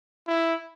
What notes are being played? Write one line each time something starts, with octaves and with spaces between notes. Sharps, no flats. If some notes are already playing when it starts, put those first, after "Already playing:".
E4